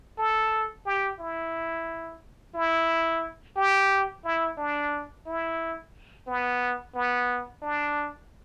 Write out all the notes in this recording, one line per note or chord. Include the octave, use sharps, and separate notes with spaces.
A4
G4
E4
E4
G4
E4
D4
E4
B3
B3
D4